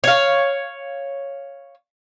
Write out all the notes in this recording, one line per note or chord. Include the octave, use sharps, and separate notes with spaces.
C#5 F5